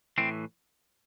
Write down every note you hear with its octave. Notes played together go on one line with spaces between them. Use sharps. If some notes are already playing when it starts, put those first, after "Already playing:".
A2 E3 C4